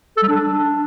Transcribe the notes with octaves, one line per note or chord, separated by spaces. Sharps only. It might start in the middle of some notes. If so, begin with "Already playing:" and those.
A4
G3
D4